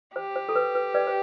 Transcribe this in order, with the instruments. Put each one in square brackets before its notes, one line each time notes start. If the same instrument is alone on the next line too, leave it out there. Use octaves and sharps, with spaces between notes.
[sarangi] G4 [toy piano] C5
[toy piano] C5
A4
B4
B4
B4 D5
C5